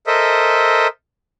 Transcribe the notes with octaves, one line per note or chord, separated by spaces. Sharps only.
A4 A#4 C5 D#5 E5